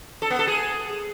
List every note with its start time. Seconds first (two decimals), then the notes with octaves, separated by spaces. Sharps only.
0.22 A4
0.30 B3
0.39 A4
0.47 G#4